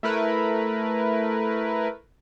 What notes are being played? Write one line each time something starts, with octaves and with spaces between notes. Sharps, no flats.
A3 E4 A#4 B4